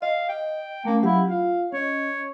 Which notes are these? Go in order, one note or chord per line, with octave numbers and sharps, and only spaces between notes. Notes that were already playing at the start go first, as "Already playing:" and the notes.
D#5 F5
G5
A3 A#3 C#4
F#3 E4 G4 F5
F4 F5
C#4 C#5 D#5